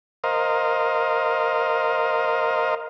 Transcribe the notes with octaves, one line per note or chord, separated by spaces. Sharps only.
A#4 C5 D#5 F5